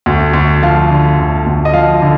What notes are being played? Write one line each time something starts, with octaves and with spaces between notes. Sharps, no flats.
D2
D2
F3 F5
D3
D2
D2
D#5
F3 F5
D3